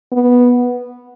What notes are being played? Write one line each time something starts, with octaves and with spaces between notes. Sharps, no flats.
B3